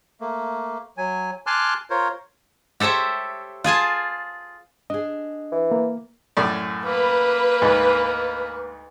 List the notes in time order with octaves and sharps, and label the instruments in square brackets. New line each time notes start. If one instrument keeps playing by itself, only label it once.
[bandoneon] A3 A#3
F#3 G#5
G#5 A5 C6 D6 F6 F#6
F4 A#4 C5 C#5
[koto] G4 A4 C5 C#5 E5
F4 G#4 G#5 A5
[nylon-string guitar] D4 G#4 [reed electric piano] D#5
[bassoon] E3
[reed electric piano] A#3
[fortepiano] F#2 A2 D5
[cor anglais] A#3 [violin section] B4
[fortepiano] D2 G#2